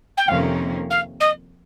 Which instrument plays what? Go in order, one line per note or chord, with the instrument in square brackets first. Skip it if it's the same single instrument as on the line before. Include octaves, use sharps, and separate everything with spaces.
[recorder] G5
[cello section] F2 C3 D#3 A#3 C#4 [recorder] F5
[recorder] F5
D#5